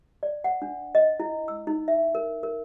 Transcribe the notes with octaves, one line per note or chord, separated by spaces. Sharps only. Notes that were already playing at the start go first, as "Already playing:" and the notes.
D5
F#5
D4
D#5
E4
E6
D#4
E5
A#4
A#4